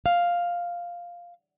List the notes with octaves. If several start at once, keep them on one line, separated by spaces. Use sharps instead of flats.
F5